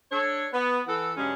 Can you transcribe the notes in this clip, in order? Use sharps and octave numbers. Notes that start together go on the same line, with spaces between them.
D4 A4 C#5
B3
E3 A4 F#5
G2 C#3 F#3 G#3 C#4 D4